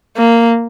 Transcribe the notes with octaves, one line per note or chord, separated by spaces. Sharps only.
A#3